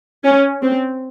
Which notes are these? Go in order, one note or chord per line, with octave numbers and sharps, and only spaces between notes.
C#4
C4